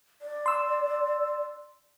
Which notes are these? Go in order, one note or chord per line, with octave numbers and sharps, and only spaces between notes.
D5
C6 E6